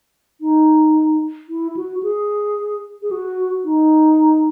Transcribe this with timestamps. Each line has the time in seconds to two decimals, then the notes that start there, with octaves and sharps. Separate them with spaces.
0.41 D#4
1.49 E4
1.77 F#4
2.03 G#4
3.02 G#4
3.11 F#4
3.65 D#4